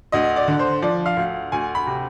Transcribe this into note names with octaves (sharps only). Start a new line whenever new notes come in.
D2 D#5
D5
D3
C5
F3 D5
F5
D2
D2 G#5
B5
C3